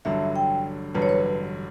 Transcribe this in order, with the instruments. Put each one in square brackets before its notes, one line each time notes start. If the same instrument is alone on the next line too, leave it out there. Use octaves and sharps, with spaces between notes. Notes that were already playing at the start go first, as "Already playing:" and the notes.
[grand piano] A1 G2 D3 F#3 [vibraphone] E5
[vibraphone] G5
[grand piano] A1 G2 D3 F#3 [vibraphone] B4
[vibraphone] C#5
B4